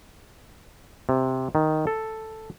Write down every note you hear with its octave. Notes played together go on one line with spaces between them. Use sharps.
C3
D#3
A4